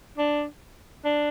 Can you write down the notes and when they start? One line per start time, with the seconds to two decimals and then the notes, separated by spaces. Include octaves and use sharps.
0.18 D4
1.05 D4